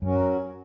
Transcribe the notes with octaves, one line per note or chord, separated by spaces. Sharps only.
F#2 F#3 C#4 F#4 A#4